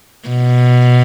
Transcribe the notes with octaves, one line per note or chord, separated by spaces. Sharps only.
B2